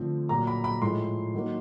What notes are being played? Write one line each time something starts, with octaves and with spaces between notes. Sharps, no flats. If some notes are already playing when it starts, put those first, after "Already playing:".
Already playing: D3 F3 A3 C4
A#2 F#3 A#3 A#5
B5
B5
A2 F3 G#3 C6
D#3 F#3 A#3